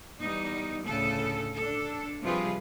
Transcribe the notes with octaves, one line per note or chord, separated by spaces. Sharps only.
E2 G3 D#4
D2 A2 C#3 A4
D4 A4
C3 F3 G3 F4 G#4 B4